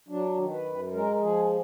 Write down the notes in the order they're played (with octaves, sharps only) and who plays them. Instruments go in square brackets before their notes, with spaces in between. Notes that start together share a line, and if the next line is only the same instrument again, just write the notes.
[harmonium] F#3 D4
D#3
B4
F#2
G#3 A#4
F3 G#4